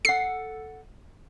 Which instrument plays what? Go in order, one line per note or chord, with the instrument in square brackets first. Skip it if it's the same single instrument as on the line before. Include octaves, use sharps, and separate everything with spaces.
[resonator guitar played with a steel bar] A4 F#5 [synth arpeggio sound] C7